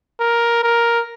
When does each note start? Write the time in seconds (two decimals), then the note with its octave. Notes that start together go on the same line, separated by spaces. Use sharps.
0.20 A#4
0.63 A#4